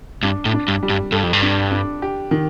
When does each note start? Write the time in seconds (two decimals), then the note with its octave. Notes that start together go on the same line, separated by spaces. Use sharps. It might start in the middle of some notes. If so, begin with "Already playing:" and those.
0.23 G2 D4
0.45 A2
0.53 D4
0.68 G2
0.83 G3
0.90 G2
1.12 G2 A4
1.23 F2
1.33 G2
1.42 D4
1.71 D4
2.02 G4
2.31 D#3